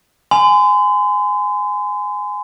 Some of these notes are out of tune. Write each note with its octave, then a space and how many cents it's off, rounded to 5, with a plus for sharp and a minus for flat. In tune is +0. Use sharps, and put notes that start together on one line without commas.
G#5 +0 C6 -40